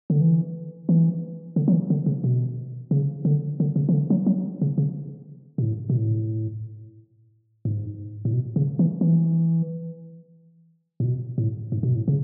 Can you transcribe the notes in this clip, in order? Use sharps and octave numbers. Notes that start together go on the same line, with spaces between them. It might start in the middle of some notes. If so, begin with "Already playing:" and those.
D3
E3
E3
D3
F#3
E3
D3
C#3
B2
C#3
D3
D3
C#3
E3
D3
F#3
F#3
C#3
C#3
B2
A2
B2
A2
G#2
A2
B2
C#3
E3
E3
A2
B2
A2
G#2
B2
A2
C#3